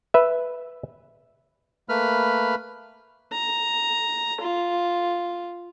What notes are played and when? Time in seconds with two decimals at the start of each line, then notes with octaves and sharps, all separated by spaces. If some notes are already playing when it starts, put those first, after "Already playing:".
0.14 B4 E5
1.89 A3 A#3 B4 B5 F6
3.32 A#5
4.41 F4